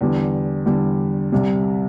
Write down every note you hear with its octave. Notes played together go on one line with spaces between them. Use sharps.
E2 D3 G3
E2 D3 G3
C2 C3 G3